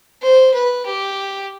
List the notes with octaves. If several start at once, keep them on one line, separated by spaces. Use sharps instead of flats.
C5
B4
G4